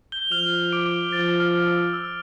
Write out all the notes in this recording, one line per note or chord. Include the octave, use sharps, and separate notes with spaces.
G6 G7
F3 F6 F7
D6 D7
F3 A6
F6
E6
E6